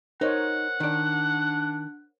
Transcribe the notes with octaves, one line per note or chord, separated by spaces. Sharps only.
D#4 A#4 C5 C#5 F#5
D#3 D4 D5